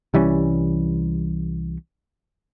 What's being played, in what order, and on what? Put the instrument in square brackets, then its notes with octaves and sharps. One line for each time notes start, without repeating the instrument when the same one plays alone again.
[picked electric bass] C2 E3 G3 C#4